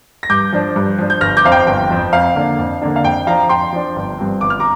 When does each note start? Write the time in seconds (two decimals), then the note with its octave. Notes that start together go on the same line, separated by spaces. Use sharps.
0.23 A#6
0.29 G2 D6 G6
0.52 F3 D4
0.76 G2
0.98 F3 D4
1.10 G6
1.21 G1 F6 A#6
1.37 D6 G6
1.45 F2 F3 C4 F5
1.52 G5
1.67 G1 G5
1.90 F2 F3 C4
2.13 F2 F5
2.35 D3 A#3 D4
2.58 F2
2.81 D3 A#3 D4
2.96 F5
3.04 F2 G5
3.27 F3 D4 F5 A#5
3.49 F2 G5 C6
3.72 F3 D4
3.96 G1
4.19 G2 F3 C4
4.41 G1 D6
4.50 F6
4.60 A#5 D6